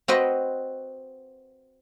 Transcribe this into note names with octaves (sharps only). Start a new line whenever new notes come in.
C4 F#4 B4 D#5